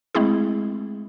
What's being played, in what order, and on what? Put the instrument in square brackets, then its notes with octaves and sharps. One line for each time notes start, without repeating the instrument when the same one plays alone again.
[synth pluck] G#3 A3 C4 E4 G#4